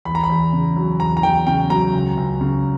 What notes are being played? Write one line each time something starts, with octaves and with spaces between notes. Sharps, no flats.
E2 B5
A#5
B5
E2
C#3
F#3
E2 A#5
A#5
E2 G5
C#3 G5
F#3 A#5
C#2
C#2
C#3